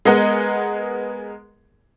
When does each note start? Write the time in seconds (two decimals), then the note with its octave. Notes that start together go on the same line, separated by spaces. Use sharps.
0.05 G#3 B3 G#4 A#4 D#5 F#5